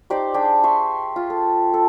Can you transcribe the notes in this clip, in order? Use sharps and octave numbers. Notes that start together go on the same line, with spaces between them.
D#4 G4 C5 D5
D4 G4 G#4
E5 C6 C#6
F4
A4
A4